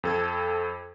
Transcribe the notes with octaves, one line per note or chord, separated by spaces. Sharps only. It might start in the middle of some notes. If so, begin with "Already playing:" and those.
F2 A4 G#6